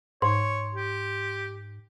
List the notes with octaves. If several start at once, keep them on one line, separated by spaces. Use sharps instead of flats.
G#2 C#5 C6
G4